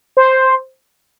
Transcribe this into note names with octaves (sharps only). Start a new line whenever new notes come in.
C5